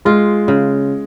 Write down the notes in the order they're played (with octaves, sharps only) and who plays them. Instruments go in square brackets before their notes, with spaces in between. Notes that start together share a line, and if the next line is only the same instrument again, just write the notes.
[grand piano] G#3 [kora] F4
[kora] C#3